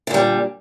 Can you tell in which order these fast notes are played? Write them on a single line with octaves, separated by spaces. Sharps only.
D3 A#2 G3